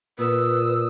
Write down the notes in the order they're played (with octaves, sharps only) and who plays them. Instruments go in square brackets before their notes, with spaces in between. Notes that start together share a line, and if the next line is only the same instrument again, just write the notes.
[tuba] A#2 [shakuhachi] B4 [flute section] D#6 E6